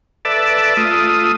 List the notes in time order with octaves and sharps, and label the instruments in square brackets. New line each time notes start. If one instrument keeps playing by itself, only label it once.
[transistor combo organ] A4 B4 D5 E5 A5
A3 F4 D#6